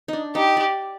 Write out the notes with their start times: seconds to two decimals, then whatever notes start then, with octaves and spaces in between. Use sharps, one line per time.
0.08 D4 D#4
0.35 D#4 G4
0.57 D5